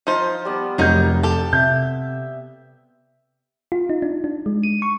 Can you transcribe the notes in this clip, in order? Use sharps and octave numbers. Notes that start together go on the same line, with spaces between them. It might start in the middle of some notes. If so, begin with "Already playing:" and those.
F3 D#4 F4 C5
G3 B3
F1 F#3 D#4 A#4 G6
G4 A4
C3 E5 G6
F4
D#4
D4
D4
G#3
D#7
C#6